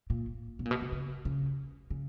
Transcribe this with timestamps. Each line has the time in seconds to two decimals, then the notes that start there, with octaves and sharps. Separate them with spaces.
0.10 A#2
0.59 B2
0.65 A#2
0.71 B2
0.81 C3
0.92 C#3
1.25 C#3
1.90 C#3